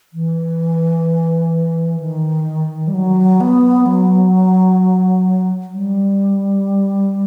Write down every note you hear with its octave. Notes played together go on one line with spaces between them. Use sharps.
E3
D#3
G3
F#3
B3
F#3
G3